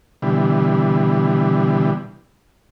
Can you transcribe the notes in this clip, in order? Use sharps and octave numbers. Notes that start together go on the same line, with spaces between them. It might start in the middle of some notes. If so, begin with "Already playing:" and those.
B2 D3 E3 G3